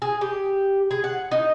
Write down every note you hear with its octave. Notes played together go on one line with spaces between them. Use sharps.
G#4
G4
G#4
F#5
D#4